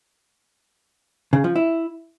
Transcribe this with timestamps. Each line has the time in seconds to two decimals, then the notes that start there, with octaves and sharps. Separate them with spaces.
1.33 C#3
1.44 F3
1.56 E4